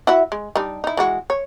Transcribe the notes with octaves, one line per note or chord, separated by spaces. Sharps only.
E4 F#4 E5
G#3
G3 D4 D#4
D#4 E4
E3 G#3 F#4
C#5